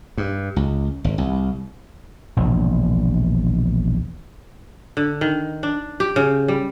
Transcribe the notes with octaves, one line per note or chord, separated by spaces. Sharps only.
G2
C#2
G#1
C2
E1 A#1
D3
D#3
D4
G4
C#3
G3